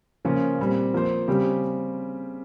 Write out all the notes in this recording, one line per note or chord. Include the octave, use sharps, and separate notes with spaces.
C#3 F3 A#3 C#4 F4
A#2 G3 C4
F3 A#3 F4 C5
C#3 G3 C4 G4